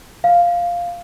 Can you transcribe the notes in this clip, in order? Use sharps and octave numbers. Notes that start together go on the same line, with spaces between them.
F5